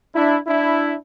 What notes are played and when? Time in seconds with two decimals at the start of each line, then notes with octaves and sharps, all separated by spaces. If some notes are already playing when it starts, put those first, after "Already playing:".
0.14 D4 E4
0.47 D4 E4